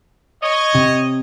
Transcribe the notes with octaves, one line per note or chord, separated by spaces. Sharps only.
C#5 D#5
C3